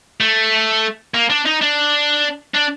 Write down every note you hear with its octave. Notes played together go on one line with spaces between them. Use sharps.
A3
A#3
D4
D#4
D4
D4